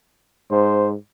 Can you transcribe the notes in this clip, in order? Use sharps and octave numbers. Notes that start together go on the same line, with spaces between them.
G#2 C5